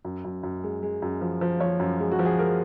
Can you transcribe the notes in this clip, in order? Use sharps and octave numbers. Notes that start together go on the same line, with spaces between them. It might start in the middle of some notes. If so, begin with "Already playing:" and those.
F#2
F#2
F#2
G#3
G#3
F#2
F3
F3
F3 C#5
F#2
G#3
F#4
F3
G#4
G#3 A#4